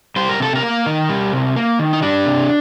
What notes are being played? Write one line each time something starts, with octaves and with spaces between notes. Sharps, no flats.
G3 C5
A#4
C3 A4
A#4
A#3
D#3
G3
C3
A#3
D#3
D#4
G3 D4
C3